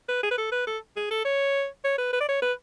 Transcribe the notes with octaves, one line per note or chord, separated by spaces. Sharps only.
B4
G#4
B4
A4
B4
A4
G#4
A4
C#5
C#5
B4
B4
D5
C#5
B4